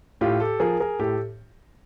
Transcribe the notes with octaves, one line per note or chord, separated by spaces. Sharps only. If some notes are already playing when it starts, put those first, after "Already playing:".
A2 F4 G4
G4 A4
F3 G#4 A#4
G#4 A#4
A2 G4 A4